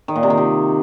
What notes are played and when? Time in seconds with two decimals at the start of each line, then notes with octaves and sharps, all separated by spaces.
0.08 D#3
0.16 A#2
0.23 C3
0.30 D#3
0.38 C3